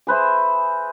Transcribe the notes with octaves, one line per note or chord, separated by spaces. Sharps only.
G#4 B4 C5 E5